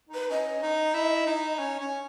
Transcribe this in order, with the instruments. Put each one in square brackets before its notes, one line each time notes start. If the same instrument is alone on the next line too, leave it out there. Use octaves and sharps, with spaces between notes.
[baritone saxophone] D#4
[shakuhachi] B4
[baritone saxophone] C#4 [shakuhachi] D#5
[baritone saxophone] D#4
E4
D#4
C#4
C#4